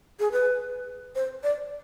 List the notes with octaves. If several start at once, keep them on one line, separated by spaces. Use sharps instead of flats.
G#4
B4
C5
D5